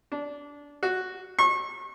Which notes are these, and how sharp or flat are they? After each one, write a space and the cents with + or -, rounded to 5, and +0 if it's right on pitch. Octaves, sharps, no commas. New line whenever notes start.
D4 -20
F#4 +0
C#6 -35